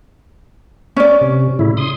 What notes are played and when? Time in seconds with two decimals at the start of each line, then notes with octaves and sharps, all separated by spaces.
0.96 C#4 D5
1.21 C3
1.59 A2 C#3 E4
1.77 C6 D#6